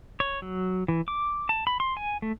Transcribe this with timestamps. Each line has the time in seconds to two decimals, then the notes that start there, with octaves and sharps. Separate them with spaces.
0.20 C#5
0.42 F#3
0.88 E3
1.08 D6
1.49 A5
1.67 B5
1.80 C6
1.97 G#5
2.22 A3